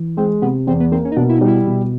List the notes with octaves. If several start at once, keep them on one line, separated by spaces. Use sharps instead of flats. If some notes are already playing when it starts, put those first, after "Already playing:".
Already playing: E3
G#3 C4
C3 B3
E2 C4
B3
A#3 C4
C#4
D#4
B2 D4
E4
G3 D#4
E4
B2